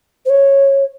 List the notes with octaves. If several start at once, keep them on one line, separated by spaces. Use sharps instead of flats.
C5
C#5